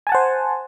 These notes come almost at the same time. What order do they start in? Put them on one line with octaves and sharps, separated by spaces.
G#5 A5 F#5 C5